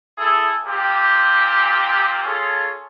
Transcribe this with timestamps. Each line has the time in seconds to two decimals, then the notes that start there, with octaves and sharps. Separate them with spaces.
0.18 E4 G#4 A4
0.65 A#2 C4 G4
2.24 C#4 F4 G#4 A4